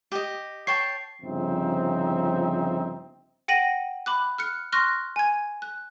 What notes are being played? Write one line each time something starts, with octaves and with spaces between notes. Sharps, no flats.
G4 D#5
C#5 G5 A5 C7
G1 C#3 F3 C4 D#4 E5
F#5 G5 A#6 D#7 F#7
B5 D6 F#6
F6 F#6 C#7
C6 C#6 F6 F#6 A#6
G#5 G#6
F#6